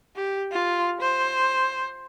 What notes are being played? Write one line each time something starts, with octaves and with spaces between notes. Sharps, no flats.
G4
F4
C5